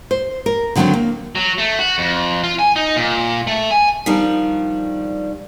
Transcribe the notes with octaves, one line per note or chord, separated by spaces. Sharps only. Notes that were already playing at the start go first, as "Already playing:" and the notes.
C5
A#4
D3 D#3 F#3 A#3 C4 D4
A#3
F#3
A3
F#4
F2
F4
G#5
D#4
A#2
A3
G#5
D#3 F3 G3 D4